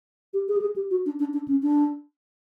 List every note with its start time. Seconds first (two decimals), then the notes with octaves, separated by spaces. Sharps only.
0.34 G4
0.48 G#4
0.56 G4
0.62 G#4
0.76 G4
0.91 F#4
1.06 D4
1.20 D4
1.34 D4
1.48 C#4
1.63 D4